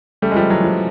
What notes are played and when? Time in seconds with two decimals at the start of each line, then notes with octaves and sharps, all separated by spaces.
0.22 C#3 G3 A3
0.31 G#3
0.35 F3 G3
0.50 E3 F#3
0.64 F3